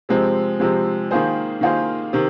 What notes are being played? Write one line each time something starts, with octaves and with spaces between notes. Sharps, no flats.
C3 F3 G#3 C4
C3 F3 G#3 C4
D#3 A#3 F4 G#4 C5
D#3 A#3 F4 G#4 C5
C3 D#3